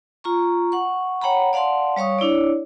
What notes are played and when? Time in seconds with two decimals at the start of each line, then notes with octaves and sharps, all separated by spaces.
0.24 F4 A#5 C#6
0.72 F#5 C#6
1.22 C#5 F#5 G5 A#5 B5
1.53 D5 F5 F#5 A5 C6
1.96 G3 C#5 F5 C#6 D#6
2.19 D4 E4 C#5 D5